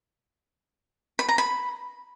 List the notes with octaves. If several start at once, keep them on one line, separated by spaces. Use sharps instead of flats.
B5
A#5
B5